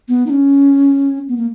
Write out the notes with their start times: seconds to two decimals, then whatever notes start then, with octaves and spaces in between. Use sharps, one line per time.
0.08 B3
0.27 D#4
0.30 C#4
1.28 B3
1.37 A#3